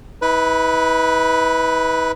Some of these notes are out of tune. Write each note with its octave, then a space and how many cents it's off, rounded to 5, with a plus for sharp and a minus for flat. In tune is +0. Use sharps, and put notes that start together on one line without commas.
E4 -45 B4 +0